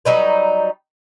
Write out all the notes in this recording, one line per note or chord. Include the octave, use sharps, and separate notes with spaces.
F#3 G3 D#4 B4